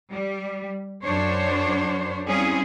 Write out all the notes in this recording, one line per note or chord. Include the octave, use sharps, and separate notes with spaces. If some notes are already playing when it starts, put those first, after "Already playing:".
G3
F#2 D4 C5 C#5
G3 C4 C#4 E4 F4 G#4